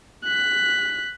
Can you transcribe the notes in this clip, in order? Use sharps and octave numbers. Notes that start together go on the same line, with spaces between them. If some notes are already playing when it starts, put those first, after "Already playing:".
F#6 B6